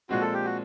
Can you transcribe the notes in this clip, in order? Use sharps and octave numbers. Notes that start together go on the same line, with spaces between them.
A#2 F3 G#3 C4 F#4
A4
G4
F#4